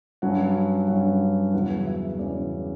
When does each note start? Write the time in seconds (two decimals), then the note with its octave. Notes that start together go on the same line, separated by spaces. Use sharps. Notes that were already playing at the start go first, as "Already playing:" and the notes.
0.22 G2 F#3 C#4 F#5
0.88 G2 F#3 C#4 F#5
1.53 E2 C#3 F#3 C#4 F#5
1.86 E5
2.18 E2 C#3 F#3 C#4 D5